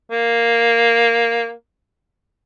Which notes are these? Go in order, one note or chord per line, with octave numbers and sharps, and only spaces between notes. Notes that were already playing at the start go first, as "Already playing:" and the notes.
A#3